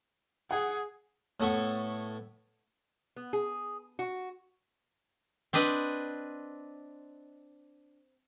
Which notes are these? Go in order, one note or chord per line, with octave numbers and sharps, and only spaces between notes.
G#4 F#5
A2 B3 A4 C#6
B3
G#4
F#4
C4 D4 B4 D#5